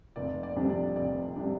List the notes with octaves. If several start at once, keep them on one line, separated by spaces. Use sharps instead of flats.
F1 D5
D5
F2 C3 G3 D4
D5
F1 D5
C3 G3 D4